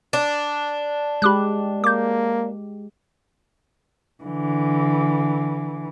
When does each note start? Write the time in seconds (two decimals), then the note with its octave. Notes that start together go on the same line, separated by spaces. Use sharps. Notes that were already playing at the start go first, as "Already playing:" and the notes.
0.13 D4
1.22 G#3 G4 B5 D6 F#6
1.84 A#3 D6 G6
4.23 D3 E3